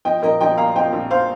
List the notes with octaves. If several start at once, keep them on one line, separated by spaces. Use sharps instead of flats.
F3 D#5 G5
A#1 A#4 D#5
A#1 D#5 G5
A#2 F5 A#5
F3 D#5 G5
A#1
C5 F5